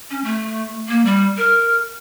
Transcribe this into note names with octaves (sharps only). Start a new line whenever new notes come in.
C#4
A3
A#3
G3
A#4